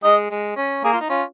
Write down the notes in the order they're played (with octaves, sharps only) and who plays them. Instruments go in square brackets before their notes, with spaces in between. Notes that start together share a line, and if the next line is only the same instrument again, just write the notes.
[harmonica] G#3 [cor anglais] D#5
[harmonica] G#3
C#4
[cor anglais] A#3 [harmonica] G#4
[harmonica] F4
D#4
C#4 F4